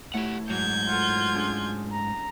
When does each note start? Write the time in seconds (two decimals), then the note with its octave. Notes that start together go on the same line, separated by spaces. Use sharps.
0.14 A3 E4 G4 C#5 F#5
0.50 G#2 F#3 G6 G#6
0.89 F4 A4 F#5
1.35 C#4 D4 G#4
1.92 A#5